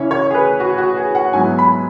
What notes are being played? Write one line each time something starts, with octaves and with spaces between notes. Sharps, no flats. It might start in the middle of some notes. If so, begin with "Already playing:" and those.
Already playing: C#3 E3 C#4 E4 C#5
C#5
G#4
B4
F#4
F#4
G#4
F#5
G#2 F#3 B3 E4 G#5
B5